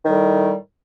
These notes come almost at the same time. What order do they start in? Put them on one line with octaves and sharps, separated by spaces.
D#3 G3 A2